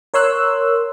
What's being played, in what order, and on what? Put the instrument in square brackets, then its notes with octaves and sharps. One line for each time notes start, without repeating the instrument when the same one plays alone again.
[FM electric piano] A#4 C#5 C6 E6 F#6